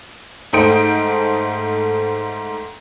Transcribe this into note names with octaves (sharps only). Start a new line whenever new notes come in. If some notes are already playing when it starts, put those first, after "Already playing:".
G#2 A3 C5 D#5 G5 D7